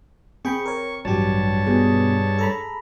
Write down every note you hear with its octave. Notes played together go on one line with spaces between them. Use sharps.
C4 G#4 G5 B5 C#6
A#4 C#5
A1 G2 F#3 G4 C#5 A5
B2 G#4
A4 A#5 B5